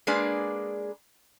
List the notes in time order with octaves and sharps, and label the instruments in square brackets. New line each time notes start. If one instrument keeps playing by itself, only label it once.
[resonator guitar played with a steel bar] G#3 A#3 D4 G#4 B4 D5